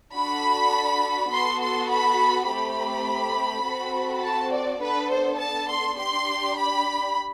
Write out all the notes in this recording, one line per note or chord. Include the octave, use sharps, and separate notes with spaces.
D4 F#4 A4 B5
B3 F#4 A4 C6
C6
B5
A3 C4 G4 B5
C4 F#4 A4
A5
D5
B3 D4 A4 B4
C5
A5
C6
D4 G4 C6
B5